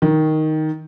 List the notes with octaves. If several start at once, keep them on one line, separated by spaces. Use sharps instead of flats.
D#3